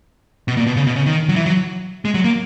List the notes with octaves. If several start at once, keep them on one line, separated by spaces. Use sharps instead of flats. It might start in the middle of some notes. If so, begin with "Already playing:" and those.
B2
A#2
B2
C#3
B2
C#3
D#3
F#3
E3
F#3
G#3
F#3
A#3